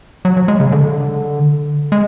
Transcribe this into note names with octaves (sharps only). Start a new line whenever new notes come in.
F#3
F#3
G#3
C#3
D3
G#3